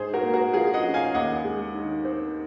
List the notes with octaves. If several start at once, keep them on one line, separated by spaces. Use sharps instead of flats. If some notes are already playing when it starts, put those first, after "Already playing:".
Already playing: G#2 G#4 C5
F#4 A#4
A#3
F#4 A#4
F3 F4 G#4
D#5 F#5
C#4
F5 G#5
D#2 D#5 F#5
G#3
D#3
C4